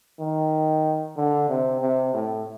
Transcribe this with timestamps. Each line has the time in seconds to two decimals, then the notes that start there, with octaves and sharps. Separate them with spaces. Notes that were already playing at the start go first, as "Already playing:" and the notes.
0.20 D#3
1.16 D3
1.49 C3
1.81 C3
2.14 A2